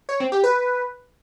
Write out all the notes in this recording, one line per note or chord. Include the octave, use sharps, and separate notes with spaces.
C#5
C4
G4
B4